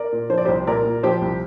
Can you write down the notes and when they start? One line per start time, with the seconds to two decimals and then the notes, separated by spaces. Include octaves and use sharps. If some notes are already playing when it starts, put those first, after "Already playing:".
Already playing: A#4 D5
0.12 A#2
0.30 F3 C5
0.38 D5
0.45 C2 G4 C5
0.67 A#2 A#4 D5
0.85 A#2
1.03 F3 G4 C5
1.22 C2